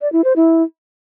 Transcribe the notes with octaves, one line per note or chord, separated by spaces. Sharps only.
D5
E4
C5
E4